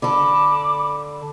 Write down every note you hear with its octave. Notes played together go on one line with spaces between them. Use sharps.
D3 A4 B5 D6